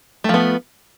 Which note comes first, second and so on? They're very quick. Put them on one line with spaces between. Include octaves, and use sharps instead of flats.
A3 F3 B3